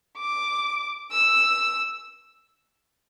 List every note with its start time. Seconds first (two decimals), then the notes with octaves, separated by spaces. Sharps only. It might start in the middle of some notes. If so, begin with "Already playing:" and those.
0.19 D6
1.11 E6